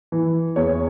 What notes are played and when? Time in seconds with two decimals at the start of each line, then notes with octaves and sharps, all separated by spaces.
0.12 E3
0.56 E2 C#5